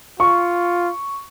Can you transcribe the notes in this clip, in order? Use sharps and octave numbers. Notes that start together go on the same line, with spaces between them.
F4 C#6